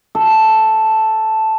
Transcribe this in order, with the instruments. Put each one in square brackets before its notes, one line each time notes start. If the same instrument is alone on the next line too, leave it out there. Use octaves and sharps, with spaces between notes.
[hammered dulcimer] A4